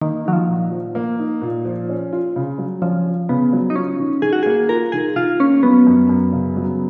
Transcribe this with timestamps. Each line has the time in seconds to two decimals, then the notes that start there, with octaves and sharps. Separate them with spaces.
0.02 D#3 A#3
0.25 F#3 D#4
0.33 F3
0.48 A#2
0.71 F3
0.95 A#3
1.19 D#4
1.41 A#2
1.65 F3
1.89 C#4
2.13 F4
2.36 C#3
2.58 F#3
2.82 F3 C#4
3.06 F4
3.29 C#3 B3
3.53 F#3
3.70 D#4
3.75 C#4 F4
3.99 D#3
4.22 D#3 G#4
4.33 F#4
4.43 A#3 G#4
4.69 F4 A#4
4.92 D#3 G#4
5.16 D#3 F4
5.40 A#3 C#4
5.63 F#3 B3
5.87 F#2
6.09 F#2
6.33 C#3
6.57 F#3